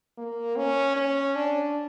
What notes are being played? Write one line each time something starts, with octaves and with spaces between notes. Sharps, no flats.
A#3
C#4
C#4
D4